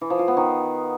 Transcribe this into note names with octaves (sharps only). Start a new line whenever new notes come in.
E3
F3
F4
B3
D#3